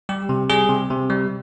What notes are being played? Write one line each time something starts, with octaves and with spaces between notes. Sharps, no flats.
G3 G4
C3
G3 G#4
C3
C3
G3